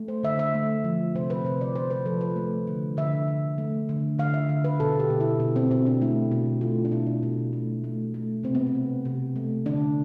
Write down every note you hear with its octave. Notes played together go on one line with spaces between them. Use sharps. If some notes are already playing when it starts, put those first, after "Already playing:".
Already playing: A3
C5
D3 E5
E5
A3
F3
C3 C5
B4
C3 C5
D5
C3 C5
B4
F3 A4
B4
A3
D3
D3 E5
D3
A3
D3
D3 F5
E5
D3
B4
B2 A4
G4
B2
E4
B2
C4
B2 C4
D4
A3 E4
B2
A3 F4
D4
B2 E4
D4
B2
A3
A3
A3
C3 C4
B3
C4
C3
C3
A3
D3 D4